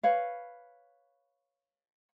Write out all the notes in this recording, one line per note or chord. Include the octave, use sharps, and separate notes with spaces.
B4 C#5 F5